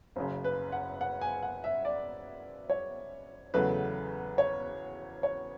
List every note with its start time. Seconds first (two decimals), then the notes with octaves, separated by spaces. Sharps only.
0.16 F#1 F#2 C#3
0.44 B4
0.72 F#5
1.01 F#5
1.21 G#5
1.43 F#5
1.64 E5
1.85 D5
2.70 C#5
3.54 E2 C#3 F#3 A3 B4
4.38 C#5
5.23 C#5